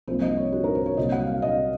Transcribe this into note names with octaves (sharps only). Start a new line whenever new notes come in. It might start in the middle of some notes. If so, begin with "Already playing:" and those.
C2 C3 F3 A#3 C5
D#5
C#5
F#4
A#4
C5
C#5
C2 C3 F#3 A#3 D#5
F#5
F5
D#5